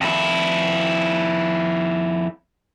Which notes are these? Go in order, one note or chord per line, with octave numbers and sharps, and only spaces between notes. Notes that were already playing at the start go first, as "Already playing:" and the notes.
F2 E4